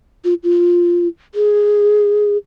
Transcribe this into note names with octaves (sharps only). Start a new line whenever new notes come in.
F4
F4
G#4